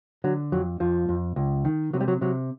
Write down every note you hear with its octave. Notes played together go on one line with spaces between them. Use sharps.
D3 F#3
F2 F#3
F2 F3
F2
C#2
D#3
C3 F#3
G3
F#3
C3 F#3